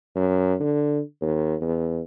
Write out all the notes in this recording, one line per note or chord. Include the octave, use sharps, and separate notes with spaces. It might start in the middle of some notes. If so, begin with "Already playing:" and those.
F#2
D3
D#2
E2